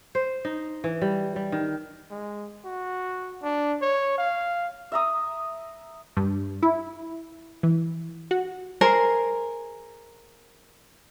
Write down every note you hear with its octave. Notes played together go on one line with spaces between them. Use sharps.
C5
D#4
E3
G3
G3
D#3
G#3
F#4
D4
C#5
F5
E5 A#5 D#6
G2
E4
E3
F#4
G#4 A#4 C5